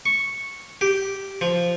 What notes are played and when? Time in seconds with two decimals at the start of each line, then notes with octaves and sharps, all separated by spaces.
0.06 C#6
0.81 G4
1.41 F3